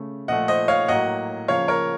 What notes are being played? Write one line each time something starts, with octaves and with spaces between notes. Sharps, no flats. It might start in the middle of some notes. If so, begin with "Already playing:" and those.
Already playing: C#3 A3
A#2 F3 A3 D#5 F#5
C5 D#5
C#5 F5
A2 F#3 A#3 D#5 F#5
C#3 F3 A#3 C#5 F5
A#4 C#5